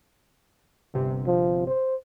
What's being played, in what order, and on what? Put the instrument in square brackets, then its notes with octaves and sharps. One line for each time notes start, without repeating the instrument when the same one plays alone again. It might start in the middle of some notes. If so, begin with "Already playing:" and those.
[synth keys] G1 C3
[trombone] F3
C5